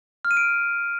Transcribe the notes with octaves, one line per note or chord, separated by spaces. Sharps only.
F6
D#7
D7